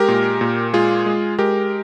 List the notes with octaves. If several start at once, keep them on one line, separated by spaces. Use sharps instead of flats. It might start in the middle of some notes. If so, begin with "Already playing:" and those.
Already playing: G#3 G4 A#4
A#2
A#2
G#3 F4 G#4
G#3
G#3 G4 A#4